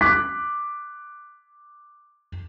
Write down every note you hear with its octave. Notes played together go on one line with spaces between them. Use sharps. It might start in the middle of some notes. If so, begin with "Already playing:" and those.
D6 F#6 B6